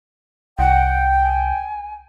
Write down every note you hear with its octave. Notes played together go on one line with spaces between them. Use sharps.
C2 F#5 G5
G#5